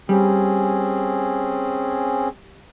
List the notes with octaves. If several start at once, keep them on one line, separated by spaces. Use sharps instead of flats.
G3 C4 C#4 G#4